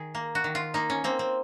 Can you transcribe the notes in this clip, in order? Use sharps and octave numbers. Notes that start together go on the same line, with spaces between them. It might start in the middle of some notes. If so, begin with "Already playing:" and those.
Already playing: D#3 G#4
A#3
F#4
D#3
F4
A#3 D#4
C#4
A#3 C4
C4